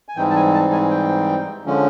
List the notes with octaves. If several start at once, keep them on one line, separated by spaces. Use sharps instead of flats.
G#5
G#2 E3 G3 C4 D#4 G5
A5
G#5
A5
G#5
G5
D3 F3 G#3 C#4